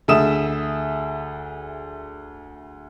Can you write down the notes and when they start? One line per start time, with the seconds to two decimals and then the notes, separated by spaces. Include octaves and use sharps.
0.08 D2 G#4 E5 D#6 E7